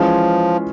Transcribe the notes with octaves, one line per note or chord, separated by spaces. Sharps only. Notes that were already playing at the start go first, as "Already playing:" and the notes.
Already playing: E3 F3 G#3 C#4 F4 G#4